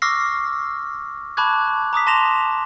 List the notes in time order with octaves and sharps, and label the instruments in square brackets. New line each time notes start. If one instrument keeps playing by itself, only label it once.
[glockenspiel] C#6 D6 E6 F6 A#6 C7
A5 B5 C#6 D6 F#6 G#6
A#5 D6 D#6 B6
A5 C6 A#6 E7 F7